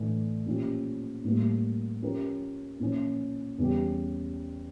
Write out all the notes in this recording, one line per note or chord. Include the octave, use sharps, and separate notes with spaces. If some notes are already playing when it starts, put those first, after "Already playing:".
Already playing: A2 E3 A3 D4
A#2 F3 C#4 G4
A2 G3 A#3
F3 C#4 G4 A#4
A#2 F3 C#4
E2 C#3 G3 C#4 G4